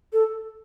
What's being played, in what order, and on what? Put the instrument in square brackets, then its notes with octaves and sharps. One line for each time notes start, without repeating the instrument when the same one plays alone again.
[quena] A4